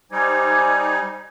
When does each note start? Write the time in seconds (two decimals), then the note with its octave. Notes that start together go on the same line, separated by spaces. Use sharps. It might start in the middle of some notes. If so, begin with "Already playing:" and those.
0.12 G3 D#4 C5 G#5 D6 G#6